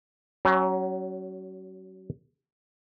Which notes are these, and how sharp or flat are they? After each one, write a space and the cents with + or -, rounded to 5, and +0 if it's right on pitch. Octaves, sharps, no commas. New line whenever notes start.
F#3 +25 C#4 +0